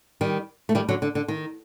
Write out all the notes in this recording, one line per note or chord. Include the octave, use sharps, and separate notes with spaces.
D#3 G3
A3
D#3 G3
D3 F#3
D3
D3
D#3